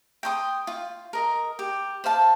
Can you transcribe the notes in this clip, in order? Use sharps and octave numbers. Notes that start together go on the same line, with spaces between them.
G5 C6 D#6
F4
A#4 D#5
G4
C5 F5 A5